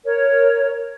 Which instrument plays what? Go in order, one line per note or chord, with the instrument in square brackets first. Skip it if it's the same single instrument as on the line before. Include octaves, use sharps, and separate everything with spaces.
[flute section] A#4 C#5